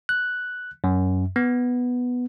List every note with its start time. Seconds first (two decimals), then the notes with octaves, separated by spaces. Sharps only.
0.09 F#6
0.84 F#2
1.36 B3